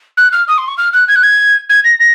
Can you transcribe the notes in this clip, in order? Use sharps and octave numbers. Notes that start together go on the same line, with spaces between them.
F#6
F6
D#6
C6
C#6
F6
F#6
G#6
F#6
G#6
G#6
A#6
A#6